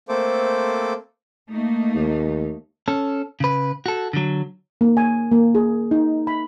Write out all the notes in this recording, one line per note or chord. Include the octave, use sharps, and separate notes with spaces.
A3 A#3 C4 A4 C5 D6
A3 A#3 D#4
D#2
C#4 A4
C#3 B4
F#4 A4
D3 F#3
A#3
G#5
A#3
G#4
D#4
B5